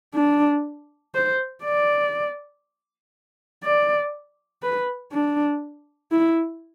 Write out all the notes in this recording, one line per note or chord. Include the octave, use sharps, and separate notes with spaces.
D4
C5
D5
D5
B4
D4
E4